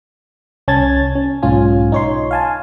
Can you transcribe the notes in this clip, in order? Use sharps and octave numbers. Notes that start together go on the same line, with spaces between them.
C2 C#4 A5 G#6 A6
C#4
B1 G#2 C#4 F4 G#5
D#4 C#5 C6
F5 G#5 A5